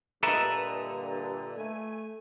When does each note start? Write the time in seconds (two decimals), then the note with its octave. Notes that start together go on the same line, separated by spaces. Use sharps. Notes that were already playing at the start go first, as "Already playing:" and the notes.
0.23 G2 A#2 D3 A4 B4 D#5 E5 A#5
1.57 A3 G#5